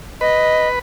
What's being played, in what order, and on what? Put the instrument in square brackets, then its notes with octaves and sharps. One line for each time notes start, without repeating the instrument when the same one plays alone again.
[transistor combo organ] B4 [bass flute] D#5